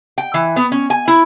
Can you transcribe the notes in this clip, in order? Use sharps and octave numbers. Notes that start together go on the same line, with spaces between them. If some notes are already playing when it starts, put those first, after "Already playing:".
G5
E3
B3
C#4
G#5
E4